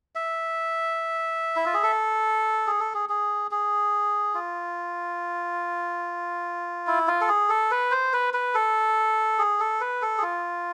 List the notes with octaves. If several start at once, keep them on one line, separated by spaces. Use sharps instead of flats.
E5
E4
F4
G#4
A4
G#4
A4
G#4
G#4
G#4
F4
E4
F4
A4
G#4
A4
B4
C5
B4
B4
A4
G#4
A4
B4
A4
G#4
F4